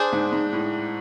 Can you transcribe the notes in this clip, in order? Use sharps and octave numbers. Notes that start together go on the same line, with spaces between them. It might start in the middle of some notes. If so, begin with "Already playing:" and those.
Already playing: D4 G#4 C5
G#2
G#2
A2